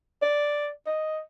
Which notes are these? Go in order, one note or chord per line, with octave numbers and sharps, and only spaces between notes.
D5
D#5